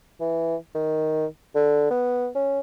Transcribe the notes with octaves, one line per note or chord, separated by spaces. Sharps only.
E3
D#3
D3
B3
C#4